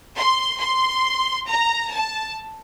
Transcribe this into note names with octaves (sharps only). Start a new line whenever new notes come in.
C6
C6
A#5
A5